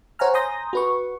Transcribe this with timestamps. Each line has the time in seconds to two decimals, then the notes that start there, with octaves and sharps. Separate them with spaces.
0.19 C5 C#5 F#5 G#5 A#5 F6
0.34 G#5 A#5 C6 D#6 G6 A#6
0.73 F#4 B4 C#6